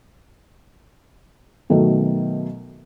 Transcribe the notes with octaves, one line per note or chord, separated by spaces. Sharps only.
B2 D#3 F#3 A3